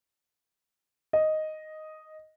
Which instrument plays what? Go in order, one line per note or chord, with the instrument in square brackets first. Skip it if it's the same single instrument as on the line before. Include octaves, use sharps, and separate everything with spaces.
[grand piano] D#5